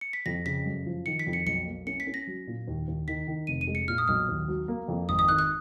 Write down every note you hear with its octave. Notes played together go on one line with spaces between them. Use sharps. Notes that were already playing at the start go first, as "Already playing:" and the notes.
C#7
B6
F2 A#6
C#3 B6
F#2
F3
D#3 C#7
B6
F2
C#7
B1 C#7
A#3
C#4 C#7
B6
C#4
A#6
F#3
A#2
D#2
D#2
D#3 B6
D#3
F1 D#7
D#7
G#3
C#7
A#2 F6
D#6
B1 F6
D#2
F#3
A#3
F2
G#1 D#6
D#6
D#3 F#6
F#6